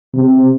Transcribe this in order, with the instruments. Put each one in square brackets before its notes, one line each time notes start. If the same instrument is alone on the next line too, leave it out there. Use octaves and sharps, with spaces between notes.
[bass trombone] C3